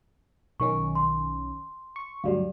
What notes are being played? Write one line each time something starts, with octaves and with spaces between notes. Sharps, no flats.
B1 D#3 C#4 C#6
C6
C#6
D2 G2 F#3 G4 D5 F5